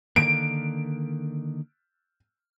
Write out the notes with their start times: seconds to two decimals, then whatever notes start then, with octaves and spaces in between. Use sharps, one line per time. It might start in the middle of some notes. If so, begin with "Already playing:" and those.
0.16 D3 D#3 A#3 D7